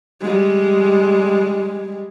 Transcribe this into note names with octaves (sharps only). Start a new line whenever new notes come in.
G3 G#3